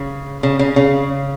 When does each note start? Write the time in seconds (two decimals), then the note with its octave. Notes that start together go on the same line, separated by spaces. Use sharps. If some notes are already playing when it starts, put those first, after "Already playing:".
Already playing: C#3
0.43 C#3
0.59 C#3
0.76 C#3